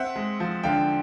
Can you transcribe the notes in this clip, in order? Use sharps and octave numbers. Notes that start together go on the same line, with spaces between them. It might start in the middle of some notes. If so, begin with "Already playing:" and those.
Already playing: C4 E5 F#5
G#3
F3
D3 F5 G5